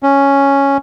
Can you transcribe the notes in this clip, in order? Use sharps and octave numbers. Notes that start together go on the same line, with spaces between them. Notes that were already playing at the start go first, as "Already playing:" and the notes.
C#4